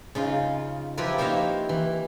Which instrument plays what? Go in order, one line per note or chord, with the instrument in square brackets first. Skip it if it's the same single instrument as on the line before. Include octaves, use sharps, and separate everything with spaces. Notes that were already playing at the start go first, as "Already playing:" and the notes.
[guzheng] C#3 D#4 F4
F3 E4 F4 G4 A#4 B4
A#3 D#4 C5 C#5 E5 F5
E3